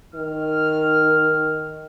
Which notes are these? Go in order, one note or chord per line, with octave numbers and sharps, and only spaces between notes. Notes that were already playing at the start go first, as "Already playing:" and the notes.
D#3 F6